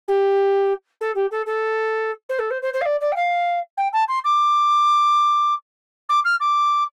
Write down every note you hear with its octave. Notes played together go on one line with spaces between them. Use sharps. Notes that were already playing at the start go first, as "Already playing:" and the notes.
G4
A4
G4
A4
A4
C5
A4
C5
C5
C5
F5
D5
D5
G5
F5
G5
A5
C6
D6
D6
F6
D6